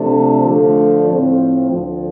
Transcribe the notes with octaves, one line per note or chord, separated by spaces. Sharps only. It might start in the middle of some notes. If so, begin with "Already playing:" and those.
Already playing: C3 F3 A3 D4 A4
D3 F3 A3 D4
A2 F3 C4
D2 D3 F3